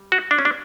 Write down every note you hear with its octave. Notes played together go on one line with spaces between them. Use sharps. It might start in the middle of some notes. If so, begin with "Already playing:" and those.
Already playing: G3
F#4
D4
C#4
D4